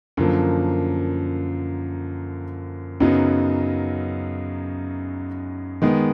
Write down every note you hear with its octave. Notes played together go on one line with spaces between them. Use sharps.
F#2 D3 F3 A#3
F#2 C#3 F#3 B3 D#4
D#3 G#3 B3